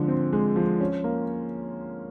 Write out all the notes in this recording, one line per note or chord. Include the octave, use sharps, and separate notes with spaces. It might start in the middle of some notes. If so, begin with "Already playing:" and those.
Already playing: D3 F3 G#3
C4
G#3
F3
C#4
A#3